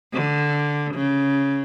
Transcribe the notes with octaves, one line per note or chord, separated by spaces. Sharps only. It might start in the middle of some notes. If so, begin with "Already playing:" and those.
D3
C#3